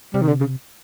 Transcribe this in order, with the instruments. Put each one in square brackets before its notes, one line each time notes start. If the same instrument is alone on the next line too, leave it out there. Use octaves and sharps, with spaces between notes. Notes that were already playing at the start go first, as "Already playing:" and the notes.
[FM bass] C3 [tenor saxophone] G3
[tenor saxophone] D#3
D3
C#3